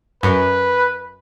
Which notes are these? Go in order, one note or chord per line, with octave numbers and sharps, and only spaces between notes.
F#2 B4